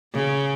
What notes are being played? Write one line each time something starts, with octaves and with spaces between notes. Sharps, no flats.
C#3